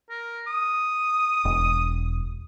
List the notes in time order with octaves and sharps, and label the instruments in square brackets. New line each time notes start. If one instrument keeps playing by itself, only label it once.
[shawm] A#4
D#6
[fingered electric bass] E1